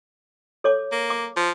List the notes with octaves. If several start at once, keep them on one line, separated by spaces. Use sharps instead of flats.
A4 C#5 D6
A#3
D6
F3